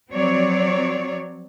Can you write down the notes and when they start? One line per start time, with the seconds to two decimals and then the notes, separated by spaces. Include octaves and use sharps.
0.11 F3 F#3 C4 C#5 D5